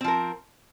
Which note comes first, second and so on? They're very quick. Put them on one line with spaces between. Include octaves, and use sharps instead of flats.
C4 F3 A#4